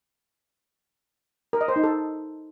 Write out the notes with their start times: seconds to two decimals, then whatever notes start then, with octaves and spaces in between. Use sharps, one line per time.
1.53 A#4
1.61 D#5
1.68 C5
1.76 D#4
1.83 A4